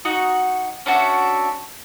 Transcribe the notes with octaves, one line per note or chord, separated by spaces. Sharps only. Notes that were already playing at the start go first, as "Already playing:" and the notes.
D#4 F#4 F#5
C#4 D4 F#4 E5